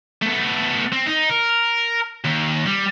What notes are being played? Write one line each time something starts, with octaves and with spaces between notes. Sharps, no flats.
A3 B3
C4
D#4
A#4
D#2
G3